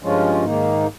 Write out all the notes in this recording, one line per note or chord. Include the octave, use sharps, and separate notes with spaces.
G2 F3 G#3 C#4 F4
G#2 D#3 A#3 D#4